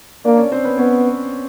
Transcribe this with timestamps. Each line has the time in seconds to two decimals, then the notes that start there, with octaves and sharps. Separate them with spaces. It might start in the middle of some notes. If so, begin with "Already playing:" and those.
0.24 A#3 D4 D5
0.37 C#4 C#5
0.52 C4 C5
0.64 B3 B4
0.78 B3 C#4 C#5